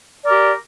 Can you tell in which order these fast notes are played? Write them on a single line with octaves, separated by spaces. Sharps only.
D5 A#4 G4